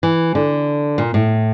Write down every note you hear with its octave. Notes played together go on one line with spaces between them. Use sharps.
E3
D3
A#2
A2